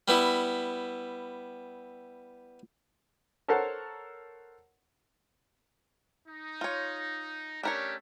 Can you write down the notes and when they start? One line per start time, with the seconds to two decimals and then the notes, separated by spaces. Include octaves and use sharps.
0.08 G3 B3 E4
3.48 A4 A#4 C5 C#5 F#5 A5
6.28 D#4
6.61 F4 C#5
7.63 A3 C#4 D4 G4 A#4 C#5